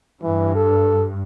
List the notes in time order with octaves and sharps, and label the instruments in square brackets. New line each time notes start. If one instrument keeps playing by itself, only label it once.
[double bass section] G2 [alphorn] E3
[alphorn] A4